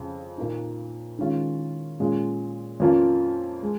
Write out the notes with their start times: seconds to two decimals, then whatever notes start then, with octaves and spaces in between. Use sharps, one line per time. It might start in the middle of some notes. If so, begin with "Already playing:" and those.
Already playing: F2 C#3
0.38 A#2 A#3 D#4
1.19 D#3 G#3 C#4 F4
2.00 A#2 G#3 C#4 F4
2.80 F2 F3 A#3 C#4 F4
3.63 G#3